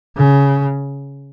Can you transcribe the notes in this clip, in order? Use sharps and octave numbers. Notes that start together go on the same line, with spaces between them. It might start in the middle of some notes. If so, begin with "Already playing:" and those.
C#3